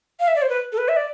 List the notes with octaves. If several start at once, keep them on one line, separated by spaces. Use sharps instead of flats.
F5
E5
D5
C5
B4
A4
B4
E5
D5